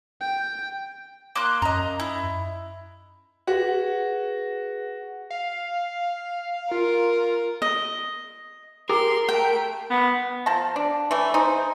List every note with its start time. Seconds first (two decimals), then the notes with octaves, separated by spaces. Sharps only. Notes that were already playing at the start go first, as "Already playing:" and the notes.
0.21 G5
1.36 A#3 C6 F#6
1.62 F#2 D#5 A#5
2.00 E4
3.47 F#4 G#4 B4 F#5
5.30 F5
6.71 F4 A#4
7.62 D#5
8.89 G4 G#4 A#4 C6
9.29 A3 G5 D7
9.90 B3
10.46 F3 A5 A#5
10.76 D4
11.11 E3 A3
11.34 D#4 G#4 C5